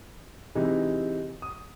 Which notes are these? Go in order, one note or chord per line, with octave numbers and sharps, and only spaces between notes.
C3 E3 G#3 D#4
D#6